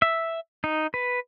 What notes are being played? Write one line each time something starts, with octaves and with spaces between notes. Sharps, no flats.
E5
D#4
B4